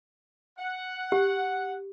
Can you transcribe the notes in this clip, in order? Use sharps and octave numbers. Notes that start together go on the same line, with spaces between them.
F#5
G4